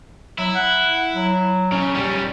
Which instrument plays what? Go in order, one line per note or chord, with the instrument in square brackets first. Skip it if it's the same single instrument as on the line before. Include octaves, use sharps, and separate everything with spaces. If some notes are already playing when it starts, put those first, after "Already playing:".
[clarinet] F#3 [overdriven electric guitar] E4
[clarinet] F#5
F#3
[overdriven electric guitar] C#3
G3 C#4